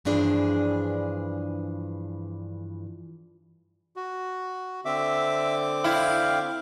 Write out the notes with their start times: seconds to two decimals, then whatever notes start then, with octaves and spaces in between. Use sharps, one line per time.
0.05 G2 E3 F3 D4 G#4
3.96 F#4
4.85 D3 C4 E5 D6
5.84 E4 F5 G5